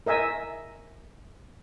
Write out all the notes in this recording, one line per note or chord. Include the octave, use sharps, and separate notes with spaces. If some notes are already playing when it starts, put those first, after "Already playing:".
A#4 D#5 E5 G#5